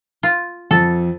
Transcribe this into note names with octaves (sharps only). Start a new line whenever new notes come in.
F4
F2 A4